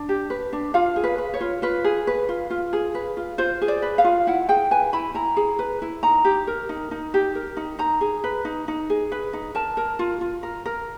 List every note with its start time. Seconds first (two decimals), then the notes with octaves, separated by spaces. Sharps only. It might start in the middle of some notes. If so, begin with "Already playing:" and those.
Already playing: D4
0.09 G4
0.30 B4
0.53 D4
0.74 F4 F5
0.96 G#4
1.04 B4
1.18 B4
1.34 C#5
1.41 F4
1.62 F4 B4
1.84 G#4
2.07 B4
2.29 F4
2.50 F4
2.73 G#4
2.95 B4
3.17 F4
3.38 F4 C5
3.61 G#4
3.68 D5
3.82 B4
3.98 F5
4.04 F4
4.27 E4 F#5
4.49 G#4 G5
4.71 B4 G#5
4.93 E4 B5
5.14 E4 A#5
5.37 G#4
5.59 B4
5.82 E4
6.03 D#4 A#5
6.25 G4
6.47 A#4
6.69 D#4
6.91 D#4
7.14 G4
7.35 A#4
7.57 D#4
7.79 D#4 A#5
8.01 G#4
8.24 B4
8.45 D#4
8.68 D#4
8.90 G#4
9.12 B4
9.33 D#4
9.55 A#4 A5
9.77 A#4
9.99 F4
10.21 F4
10.43 A#4
10.66 A#4